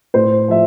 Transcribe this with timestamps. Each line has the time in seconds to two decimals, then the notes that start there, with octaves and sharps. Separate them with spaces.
0.14 A2 C5
0.48 F3 E5